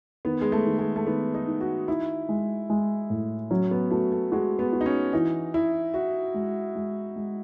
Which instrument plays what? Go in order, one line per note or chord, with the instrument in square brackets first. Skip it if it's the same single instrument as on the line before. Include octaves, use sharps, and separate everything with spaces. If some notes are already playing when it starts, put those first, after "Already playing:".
[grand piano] D#3 [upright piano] B3
[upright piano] G#3
A3
[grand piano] D#3
[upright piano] G#3
A3
[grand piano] D#3 [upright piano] B3
[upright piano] D#4
[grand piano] D#3
[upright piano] F#4
[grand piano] D#4 [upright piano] E4
[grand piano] G#3
G#3
A2
[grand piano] F#3 [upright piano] C#4
[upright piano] B3
[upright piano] A3 [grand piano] F#4
[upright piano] A3
[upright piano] G#3 [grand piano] F#4
[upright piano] B3
[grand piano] F#4
[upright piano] D#4
C#4
[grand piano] E3 [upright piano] D#4
[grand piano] E3 [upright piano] E4
[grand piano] E4 [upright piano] F#4
[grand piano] G#3
G#3
G#3